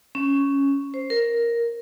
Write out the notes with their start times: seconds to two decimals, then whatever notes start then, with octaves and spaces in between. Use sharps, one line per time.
0.15 C#4
0.94 C5
1.10 A#4